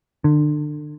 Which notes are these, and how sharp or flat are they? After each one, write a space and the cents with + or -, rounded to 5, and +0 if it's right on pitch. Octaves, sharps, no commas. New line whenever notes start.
D3 +30